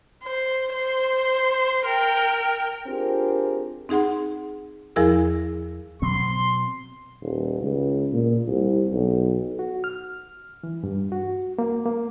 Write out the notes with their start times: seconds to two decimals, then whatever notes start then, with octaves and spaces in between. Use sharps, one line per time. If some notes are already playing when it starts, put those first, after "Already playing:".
0.24 C5
0.73 C5
1.85 A#4 G5
2.87 C4 D4 F4 G4 G#4 A#4
3.89 C4 D#4 G#4 F#5 C6
4.96 E2 F3 E4 G#4 A#4 E6
6.02 B2 F#3 C4 C6
7.22 D#1
7.61 C#2
8.13 A#2
8.47 C2
8.93 B1
9.59 F#4
9.84 F6
10.63 E3
10.84 G2
11.12 F#4
11.59 A#3
11.86 A#3